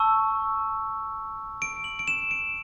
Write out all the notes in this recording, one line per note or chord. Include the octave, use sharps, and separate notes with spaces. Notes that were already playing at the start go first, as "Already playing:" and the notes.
Already playing: A5 C#6 E6
D7
F#7
D7
E7
D7